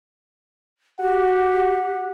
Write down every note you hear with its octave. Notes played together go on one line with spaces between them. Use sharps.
F#4 G4 F#5